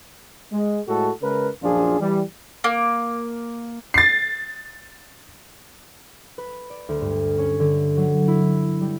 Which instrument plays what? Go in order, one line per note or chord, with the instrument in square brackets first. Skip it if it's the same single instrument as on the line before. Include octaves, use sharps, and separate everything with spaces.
[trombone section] G#3
A2 G#3 F#4 A4
C#3 G#3 A#4 B4
A#1 F#2 F3 D4 F4 G#4
E3 G3
[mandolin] A#3
[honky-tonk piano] A6 C7
[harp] B4
D5
D2
G2
C#4
D3
F#3
E4
G3